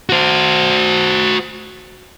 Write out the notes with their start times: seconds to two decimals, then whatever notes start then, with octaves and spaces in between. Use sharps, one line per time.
0.10 F#4 C5